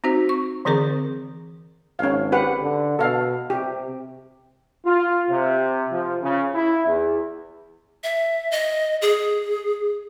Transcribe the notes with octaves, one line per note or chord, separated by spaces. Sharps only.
C4 D#4 F#4 C5
C#6
D3 E3 C4 G#4 A#4 D6
G#1 C#4 F5
G4 B4 F#5
D3
B2 A4 F5
C3 G4
F4
C3
F3
C#3
E4
E2
E5
D#5
G#4